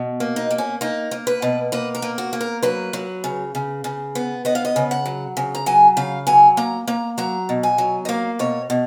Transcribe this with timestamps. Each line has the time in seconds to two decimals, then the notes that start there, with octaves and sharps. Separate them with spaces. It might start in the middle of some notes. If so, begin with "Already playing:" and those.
Already playing: B2
0.20 A#3
0.36 D#4
0.51 A#3
0.58 C#4
0.81 A#3 D#4
1.11 A#3
1.27 B4
1.42 B2
1.72 A#3 B4
1.95 A#4
2.02 A#3
2.18 F#4
2.33 A#3
2.41 A#4
2.63 F#3 B4
2.93 F#3
3.24 C#3
3.55 C#3
3.84 C#3
4.15 B3
4.45 B3 D#5
4.55 F5
4.65 D#5
4.76 C#3
4.91 F#5
5.06 F#3
5.37 C#3
5.55 A#5
5.66 F#3 G#5
5.97 C#3 F5
6.27 F#3 G#5
6.57 A#3 A#5
6.88 A#3 A#5
7.18 F#3 A#5
7.49 B2
7.63 G#5
7.78 F#3
8.05 D#5
8.09 A#3 F5
8.39 B2 C#5
8.70 B2